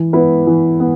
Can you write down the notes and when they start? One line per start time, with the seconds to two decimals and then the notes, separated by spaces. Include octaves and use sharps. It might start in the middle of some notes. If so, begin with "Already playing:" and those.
Already playing: E3
0.13 B3 E4 B4
0.47 E3
0.80 B3